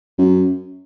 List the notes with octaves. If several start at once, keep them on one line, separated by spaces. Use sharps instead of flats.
F#2